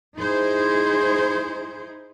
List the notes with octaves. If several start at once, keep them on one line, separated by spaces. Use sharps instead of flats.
D#4 E4 G#4 C5